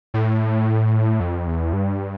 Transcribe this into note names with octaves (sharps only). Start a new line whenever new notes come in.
A2
F2
E2
G2